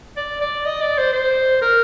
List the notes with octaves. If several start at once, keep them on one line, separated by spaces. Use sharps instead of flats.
D5
D5
D#5
D5
C5
C5
A#4